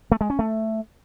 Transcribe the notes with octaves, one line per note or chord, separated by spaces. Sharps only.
A3
G#3
C#4
A3